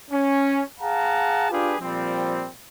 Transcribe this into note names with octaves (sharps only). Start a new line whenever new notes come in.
C#4
G#4 F5 F#5 A5 A#5
D4 F4 G4 G#4 B4
A#2 F3 G3 C4